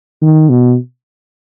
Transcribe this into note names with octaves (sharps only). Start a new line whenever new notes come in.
D#3
B2